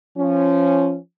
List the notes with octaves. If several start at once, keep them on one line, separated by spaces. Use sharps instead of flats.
F3 C#4